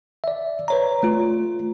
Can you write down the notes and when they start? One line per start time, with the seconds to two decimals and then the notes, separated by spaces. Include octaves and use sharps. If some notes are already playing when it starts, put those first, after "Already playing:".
0.24 D5 E5
0.68 B4 C#5 A#5
1.03 A3 F4